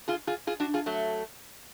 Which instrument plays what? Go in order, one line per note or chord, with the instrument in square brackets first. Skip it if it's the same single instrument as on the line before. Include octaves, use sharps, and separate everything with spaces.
[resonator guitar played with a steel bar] F4 G#4
F4 G#4
F4 G#4
D4 F#4
F4 G#4
F#3 A3